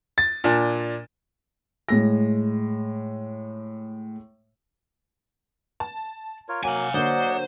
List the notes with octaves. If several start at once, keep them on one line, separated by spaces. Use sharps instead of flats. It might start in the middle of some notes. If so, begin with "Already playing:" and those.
A6
A#2 D4
A2 G#3 A#6
A5
F4 A#4 C#5
F#3 A#3 F5 F#5 G#5
D3 F#3 A#3 C5 D5 D#5 F#5